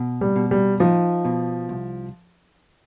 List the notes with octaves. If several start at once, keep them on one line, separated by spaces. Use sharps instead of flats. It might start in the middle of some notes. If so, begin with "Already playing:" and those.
Already playing: B2
G3
B2
G3
F3 D#4
B2
C2